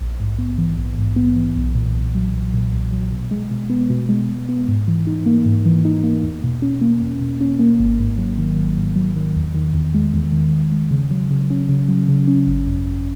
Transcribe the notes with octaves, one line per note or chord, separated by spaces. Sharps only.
A#1
G#2
B3
E3
A#1
G#2
B3
E3
B1
A#2
B1
F#3
B1
A#2
B1
F#3
B2
G#3
B2
B3
B2
G#3
B2
B3
G#2
E3
D#4
A#3
G#2
E3
D#4
A#3
E2
B2
C#4
A#3
E2
B2
C#4
A#3
G#1
G#2
F#3
D#3
G#1
G#2
F#3
D#3
E2
D#3
E2
G#3
E2
D#3
E2
G#3
C#3
F#3
C#3
C#4
C#3
F#3
C#3
C#4
G#1
F#2
G#1